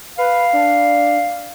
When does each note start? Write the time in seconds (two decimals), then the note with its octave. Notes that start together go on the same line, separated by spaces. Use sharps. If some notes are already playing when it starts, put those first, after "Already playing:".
0.18 B4 F5
0.53 D4